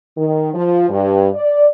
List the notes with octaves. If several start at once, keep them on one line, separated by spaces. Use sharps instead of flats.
D#3
F3
G2
D5